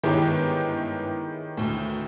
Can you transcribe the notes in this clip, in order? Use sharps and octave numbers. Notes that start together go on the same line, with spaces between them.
G1 G#2 D#3 E4 G4 G#4 B4 C#5
D2 A2